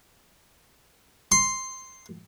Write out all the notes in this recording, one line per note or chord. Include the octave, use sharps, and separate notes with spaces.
C6